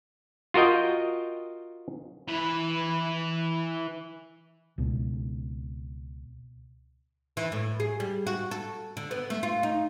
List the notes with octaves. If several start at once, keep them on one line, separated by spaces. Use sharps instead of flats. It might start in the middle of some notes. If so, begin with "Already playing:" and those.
F4 F#4 A#4 D#5 G5
E3 B4
C#2 B2
E3
A2
G#4
G3
F#4
A4
D3
B3
A3
F4
D#4